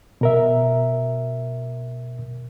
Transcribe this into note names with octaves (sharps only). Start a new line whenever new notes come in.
B2 A#4 E5